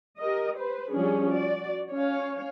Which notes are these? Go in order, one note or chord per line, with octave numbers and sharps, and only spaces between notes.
G4 A#4 D#5
B4 C5
F3 G3 C#4 D4 G#4
F#4 D5
C#4 C#5 F5